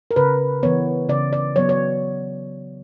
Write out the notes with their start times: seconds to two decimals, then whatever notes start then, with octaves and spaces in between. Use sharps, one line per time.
0.11 A#4
0.16 C#3 B4
0.63 E3 B3 C#5
1.09 C#3 D5
1.33 D5
1.56 F#3 B3 C#5
1.69 C#5